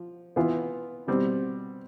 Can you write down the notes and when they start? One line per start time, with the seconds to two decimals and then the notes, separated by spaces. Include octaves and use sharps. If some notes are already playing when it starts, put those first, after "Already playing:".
Already playing: F3
0.36 E3 B3 F4
1.07 B2 G3 C4